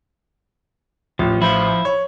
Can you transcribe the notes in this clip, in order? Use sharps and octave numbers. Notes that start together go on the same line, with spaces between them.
A1 F3
F3 E4 C5 F5
C#5